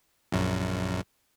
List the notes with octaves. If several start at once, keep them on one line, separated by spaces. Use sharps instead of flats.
A#1 F#2